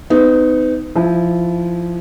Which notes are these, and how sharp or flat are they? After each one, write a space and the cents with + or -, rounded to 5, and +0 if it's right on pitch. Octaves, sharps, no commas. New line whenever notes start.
B3 +40 D#4 +0
F3 -15 E4 +0